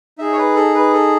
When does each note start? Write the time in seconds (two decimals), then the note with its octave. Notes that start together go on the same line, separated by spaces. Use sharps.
0.18 D#4 G#4 E5
0.33 C#5
0.38 B4
0.56 A4
0.75 B4
0.93 A4